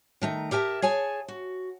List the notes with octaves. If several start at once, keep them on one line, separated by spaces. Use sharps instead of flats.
D#3 A3 A#5
G4 A#4 E5 G#5 A5
G#4 C#5 G#5 A5
F#4